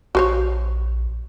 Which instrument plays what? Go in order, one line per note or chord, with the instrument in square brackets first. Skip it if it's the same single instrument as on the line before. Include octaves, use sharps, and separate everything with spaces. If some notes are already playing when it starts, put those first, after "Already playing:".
[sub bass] A#1 [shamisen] F#4 C5 C#5